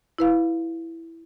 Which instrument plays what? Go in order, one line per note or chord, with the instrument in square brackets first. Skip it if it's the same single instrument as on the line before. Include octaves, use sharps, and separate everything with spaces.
[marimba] E4 B4 F5